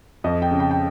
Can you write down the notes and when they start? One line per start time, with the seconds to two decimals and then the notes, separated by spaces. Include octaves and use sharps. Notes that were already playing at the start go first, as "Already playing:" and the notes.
0.24 F2 D#5
0.42 G5
0.51 C#3
0.60 G5
0.71 G5